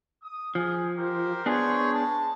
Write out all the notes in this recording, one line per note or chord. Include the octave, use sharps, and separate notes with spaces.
D#6
F3 G#4
G4 A#4 C5
B3 D4 G#4 C5 C#5
G#3 A5